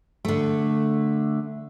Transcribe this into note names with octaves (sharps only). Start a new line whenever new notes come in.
D3 A3